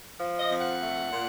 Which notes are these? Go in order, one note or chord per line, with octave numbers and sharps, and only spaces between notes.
F3
D#5
F2
F#5
A3
A#2